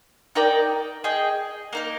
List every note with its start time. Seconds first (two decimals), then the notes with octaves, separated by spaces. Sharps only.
0.35 D#4 A#4 D5 G5
1.04 G#4 D#5 G5
1.73 A#3 D#4 A#4